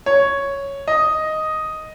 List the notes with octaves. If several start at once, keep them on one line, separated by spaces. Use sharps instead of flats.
C#5
D#5